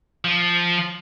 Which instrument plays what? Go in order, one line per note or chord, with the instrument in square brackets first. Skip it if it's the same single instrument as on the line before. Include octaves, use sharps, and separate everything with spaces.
[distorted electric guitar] F3